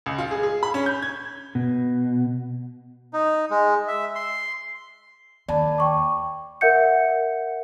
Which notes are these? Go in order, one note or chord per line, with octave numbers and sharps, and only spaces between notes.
C#2
F4
G#4
G#4
B5
C#4
G6
G#6
B2
D#4
G#3
E5
C6
D#2 D5 A5 B5
G5 C#6 D6
A#4 E5 F#5 G6 C#7